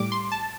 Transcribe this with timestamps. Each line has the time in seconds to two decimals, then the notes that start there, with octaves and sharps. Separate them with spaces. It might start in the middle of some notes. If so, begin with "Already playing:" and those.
Already playing: A2 G3 D6
0.12 C6
0.32 A5